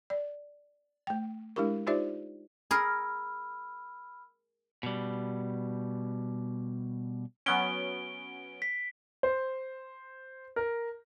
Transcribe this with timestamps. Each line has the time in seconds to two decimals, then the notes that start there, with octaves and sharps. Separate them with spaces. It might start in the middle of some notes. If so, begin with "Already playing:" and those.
0.10 D5
1.07 A3 G5
1.56 G#3 D4 E4 G4 A#4
1.87 D#4 F4 G4 C5 D5 E5
2.71 G#4 A#4 B5 E6 F6
4.83 B2 G3
7.46 F#3 B3 C#4 D7 G7
8.62 B6
9.23 C5
10.56 A#4